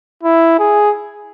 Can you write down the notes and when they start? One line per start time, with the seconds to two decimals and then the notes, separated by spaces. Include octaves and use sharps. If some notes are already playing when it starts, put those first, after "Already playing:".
0.23 E4
0.59 G#4